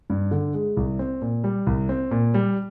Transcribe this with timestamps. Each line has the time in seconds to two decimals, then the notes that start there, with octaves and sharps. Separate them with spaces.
0.10 G2
0.31 D3
0.54 G#3
0.77 C2
0.99 C4
1.22 A#2
1.44 G3
1.67 C2
1.89 C4
2.11 A#2
2.34 G3